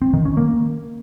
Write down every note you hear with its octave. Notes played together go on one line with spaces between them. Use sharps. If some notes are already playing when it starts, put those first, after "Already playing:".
C4
D#3
C#4
A#3